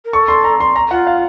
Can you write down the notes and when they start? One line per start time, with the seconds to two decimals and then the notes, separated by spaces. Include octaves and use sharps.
0.05 A#4
0.13 A4 C#6
0.28 C6
0.44 A#5
0.60 C6
0.76 A#5
0.91 F4 F#5
1.07 F5